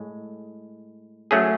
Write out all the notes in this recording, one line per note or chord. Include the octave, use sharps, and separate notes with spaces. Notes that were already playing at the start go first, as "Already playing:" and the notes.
Already playing: A2 G#3
F#3 A3 C#4 G#4